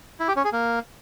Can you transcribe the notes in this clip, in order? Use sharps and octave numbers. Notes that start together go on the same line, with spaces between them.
E4
G4
C#4
G#4
A#3